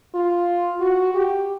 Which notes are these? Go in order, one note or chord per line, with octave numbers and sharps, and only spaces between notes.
F4
F#4
G4